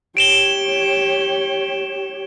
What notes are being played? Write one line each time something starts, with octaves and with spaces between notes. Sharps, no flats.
G4 C#5 D7 E7 G7